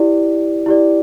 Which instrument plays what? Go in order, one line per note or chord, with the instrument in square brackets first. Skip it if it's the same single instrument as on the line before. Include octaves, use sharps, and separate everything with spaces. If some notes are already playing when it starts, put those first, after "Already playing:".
Already playing: [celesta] E4 G4 D5
E4 G4 D5